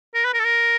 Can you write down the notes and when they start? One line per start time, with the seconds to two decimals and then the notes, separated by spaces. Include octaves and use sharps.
0.14 A#4
0.24 B4
0.34 A#4
0.39 A4
0.44 A#4